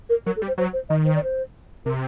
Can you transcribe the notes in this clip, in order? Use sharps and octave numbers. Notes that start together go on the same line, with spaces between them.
A#4
F#3 A#4
A4
G3
C5
F#3 C5
C5
D#3 D#5
C5
D5
C5
C3 A#4